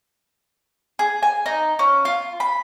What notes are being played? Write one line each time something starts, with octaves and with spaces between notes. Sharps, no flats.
G#4
G#5
D#4
C#4
F4
B5